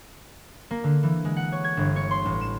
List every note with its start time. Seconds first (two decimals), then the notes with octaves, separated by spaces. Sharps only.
0.71 A#3
0.84 D3
1.03 E3
1.25 G#3
1.36 F#5
1.52 C#5
1.64 G#6
1.77 G1
1.96 C#5
2.11 C6
2.25 A1
2.41 E7